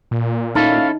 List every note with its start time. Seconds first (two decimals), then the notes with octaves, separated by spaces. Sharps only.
0.11 A#2
0.55 C#4 D#4 E4 A4 F5